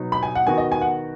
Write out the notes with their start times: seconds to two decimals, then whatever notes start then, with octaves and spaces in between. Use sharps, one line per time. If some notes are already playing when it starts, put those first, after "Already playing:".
Already playing: B2 F#3 B3 D#4
0.12 B5
0.23 G#5
0.35 F#5
0.47 D#3 B3 F#4 G#5
0.58 D#5
0.72 G#5
0.81 F#5